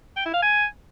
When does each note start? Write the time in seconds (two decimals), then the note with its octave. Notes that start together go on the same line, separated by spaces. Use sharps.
0.17 G5
0.25 E4
0.34 F5
0.42 G#5